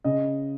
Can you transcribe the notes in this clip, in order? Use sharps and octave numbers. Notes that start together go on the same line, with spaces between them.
C#3 D#5